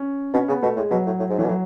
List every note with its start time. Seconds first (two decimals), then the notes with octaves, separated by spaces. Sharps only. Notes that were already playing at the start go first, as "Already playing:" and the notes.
Already playing: C#4
0.34 B2 C#4
0.48 C#3 B3
0.62 B2 A3
0.76 A2 G#3
0.91 B2 F#3
1.06 A2
1.19 A2
1.30 G#2
1.38 A2 E3
1.45 B2
1.49 A2 F#3